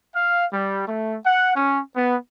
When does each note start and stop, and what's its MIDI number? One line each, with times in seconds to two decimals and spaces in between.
0.15 0.45 77
0.52 0.83 55
0.87 1.16 57
1.25 1.51 78
1.55 1.80 61
1.95 2.16 59